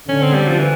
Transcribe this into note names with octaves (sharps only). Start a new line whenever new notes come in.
D3 C#4
C4
G3
F3
E3